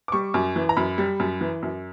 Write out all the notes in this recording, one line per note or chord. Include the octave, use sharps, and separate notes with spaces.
D6
G3 C#6
F#2
E3
A#5
F#2 B5
G3
F#2
E3
F#2